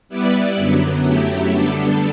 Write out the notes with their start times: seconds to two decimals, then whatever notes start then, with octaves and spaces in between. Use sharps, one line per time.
0.09 G3 B3 E4 B4 D5
0.56 F#2 D3 F#3 B3
1.03 F#2 F#3 A3 E4 G4
1.51 D3 G3 B3 D4 A4